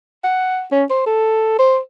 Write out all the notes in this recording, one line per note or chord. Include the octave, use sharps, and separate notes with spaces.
F#5
C#4
C5
A4
C5